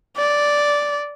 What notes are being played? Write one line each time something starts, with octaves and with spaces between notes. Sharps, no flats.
D5